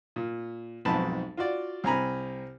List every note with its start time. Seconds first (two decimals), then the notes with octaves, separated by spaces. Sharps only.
0.16 A#2
0.85 B1 F2 G#2 A5 B5
1.37 F4 F#4 D5
1.84 C2 C4 G#5 A#5 B5